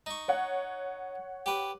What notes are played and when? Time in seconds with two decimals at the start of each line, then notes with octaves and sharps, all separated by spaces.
0.06 D#4 C#6
0.28 C#5 F#5
1.46 G4 B4